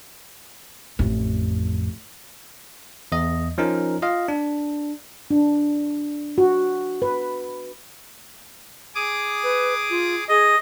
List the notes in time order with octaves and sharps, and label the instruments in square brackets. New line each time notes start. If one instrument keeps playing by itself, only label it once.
[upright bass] A1 F2
[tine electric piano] E2 D#5
F3 C#4 D#4 A#4
F4 D#5 F5
D4
[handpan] D4
F#4
B4
[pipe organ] G#4 D6 D#6
[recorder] B4
F4
[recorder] G#4 [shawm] D#5